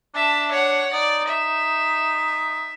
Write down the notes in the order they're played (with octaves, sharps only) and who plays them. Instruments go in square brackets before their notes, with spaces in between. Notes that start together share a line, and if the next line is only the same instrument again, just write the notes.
[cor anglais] D4 [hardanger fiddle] E5 A5
[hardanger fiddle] C#5 F#5
[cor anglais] D#4 [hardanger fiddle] D5
[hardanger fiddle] E5